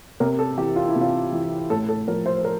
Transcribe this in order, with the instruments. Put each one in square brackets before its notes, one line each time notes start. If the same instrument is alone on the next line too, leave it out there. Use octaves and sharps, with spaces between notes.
[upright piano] C3 A#4
A4
E3 G4
F4
E4
C3
F4
E3
A2 A4
A4
F3 A#4
C5
A#4